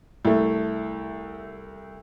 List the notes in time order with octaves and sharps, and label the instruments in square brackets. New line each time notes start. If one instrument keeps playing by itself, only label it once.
[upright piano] C2 A3